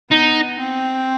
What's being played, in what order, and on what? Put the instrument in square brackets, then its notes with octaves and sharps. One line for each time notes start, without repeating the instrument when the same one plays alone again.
[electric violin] B3 [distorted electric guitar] D#4
[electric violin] C4